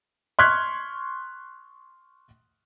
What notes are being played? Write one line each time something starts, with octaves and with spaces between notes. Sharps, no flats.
C6 C#6 F6 F#6 G#6 B6